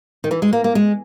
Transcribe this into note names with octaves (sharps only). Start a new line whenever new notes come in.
D#3
E3
G#3
A#3
A#3
G#3